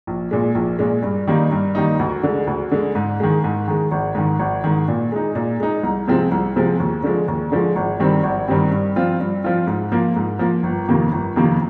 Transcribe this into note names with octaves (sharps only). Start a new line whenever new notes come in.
A#1
A#2 G#3
A#1
A#2 G#3
G2
D#3 G3 A#3 D#4
G2
D#3 G3 A#3 D#4
D2
D3 G#3
D2
D3 G#3
G#2
D#3 G#3
G#2
D#3 G#3
G#1
G#2 D#3
G#1
G#2 D#3
A#2
G#3 D#4
A#2
G#3 D#4
C2
C3 F3 G#3 C4
C2
C3 F3 G#3 C4
D#2
D3 F3 G#3
D#2
D3 F3 G#3
G#1
G2 D#3 G3 C4
G#1
G2 D#3 G3 C4
G2
F3 C4 F4
G2
F3 C4 F4
G#2
F3 A#3
G#2
F3 A#3
G1
F2 C3 D#3 A#3
G1
F2 C3 D#3 A#3